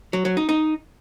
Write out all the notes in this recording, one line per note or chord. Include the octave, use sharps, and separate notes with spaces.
F#3
F#3
D#4
D#4